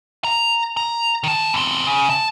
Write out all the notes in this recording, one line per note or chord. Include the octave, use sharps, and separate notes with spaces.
A#5
A#5
D#3 A5
E2 C4
C#3
A5